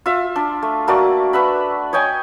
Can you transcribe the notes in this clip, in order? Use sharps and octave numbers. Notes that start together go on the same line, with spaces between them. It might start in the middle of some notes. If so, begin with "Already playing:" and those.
F4 E5
D4
A3
A3 A#3 F#4 D5
B4 E5 F#5 B5
C#5 D#5 G5 G#5